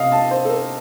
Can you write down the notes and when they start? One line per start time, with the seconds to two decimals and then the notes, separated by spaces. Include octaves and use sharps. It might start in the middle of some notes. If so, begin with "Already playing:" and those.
Already playing: C3 D#5 F5
0.12 A5
0.31 C5
0.45 A4
0.49 A#4